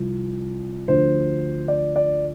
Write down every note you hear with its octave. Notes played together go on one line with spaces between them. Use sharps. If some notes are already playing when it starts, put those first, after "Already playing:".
Already playing: C2 C3 F3
D2 D3 F3 C5
D5
D5